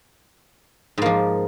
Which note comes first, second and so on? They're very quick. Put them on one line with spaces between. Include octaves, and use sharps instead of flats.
G#2 A#3 F3